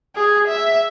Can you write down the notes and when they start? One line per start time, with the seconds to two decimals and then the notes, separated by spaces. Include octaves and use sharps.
0.15 G#4
0.48 E5